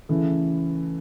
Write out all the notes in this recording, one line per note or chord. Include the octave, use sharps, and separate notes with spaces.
C#3 E3 A3